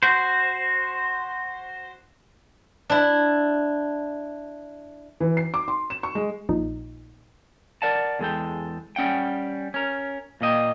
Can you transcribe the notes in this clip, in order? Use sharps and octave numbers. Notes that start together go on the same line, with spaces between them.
F#4 C5
D4 E4
E3
C7
D6
C6
E7
C#6
G#3
A#1 A#2 D#4
A#4 D5 F#5 A5
E2 G#3 A4 G5
G3 C#4 F#5 G5
C#4 A#4
A#2 A#3 D#5 G5